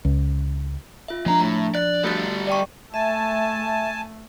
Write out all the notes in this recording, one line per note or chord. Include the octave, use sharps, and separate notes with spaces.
C#2
F4 E5
F3 G#3 D4 A#5
A2 A#5
D5 F#6
G3 A3 F#4 A4 A6
D5 G5 C#6
A3 E5 G#5 A5